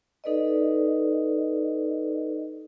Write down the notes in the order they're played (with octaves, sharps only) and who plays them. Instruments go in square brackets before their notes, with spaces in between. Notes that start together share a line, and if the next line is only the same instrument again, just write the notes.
[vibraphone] D#4 A4 B4 D5 D#5